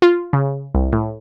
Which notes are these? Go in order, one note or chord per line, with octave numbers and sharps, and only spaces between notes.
F4
C#3
C2
A2